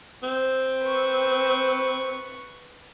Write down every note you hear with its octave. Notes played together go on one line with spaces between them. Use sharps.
C4
B4 C#6